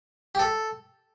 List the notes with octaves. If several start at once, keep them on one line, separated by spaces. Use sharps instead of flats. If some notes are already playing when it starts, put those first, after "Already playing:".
G4
A4